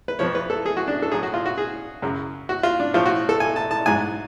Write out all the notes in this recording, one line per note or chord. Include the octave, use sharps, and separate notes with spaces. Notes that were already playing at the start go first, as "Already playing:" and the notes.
B4
F2 F3 C#5
B4
A4
G#4
F#4
D4
A4
A2 F#3 G#4
F#4
F4
F#4
G#4
F#2 C#3 F#3
F#4
F4
D4
A2 F3 F4
F#4
A4
G#5
A5
A5
G#2 F#3 G#5